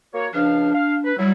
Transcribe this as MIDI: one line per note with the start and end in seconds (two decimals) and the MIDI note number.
0.14 0.28 58
0.14 0.28 66
0.14 0.28 73
0.34 0.70 37
0.34 0.70 53
0.34 1.12 62
0.34 0.70 77
0.74 0.96 77
1.05 1.18 71
1.18 1.32 54
1.18 1.31 55
1.18 1.32 64